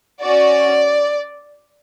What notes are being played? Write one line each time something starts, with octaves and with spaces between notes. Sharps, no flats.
C#4 F#4 D5